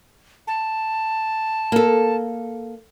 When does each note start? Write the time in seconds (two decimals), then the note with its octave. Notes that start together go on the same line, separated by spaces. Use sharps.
0.47 A5
1.72 A#3 A4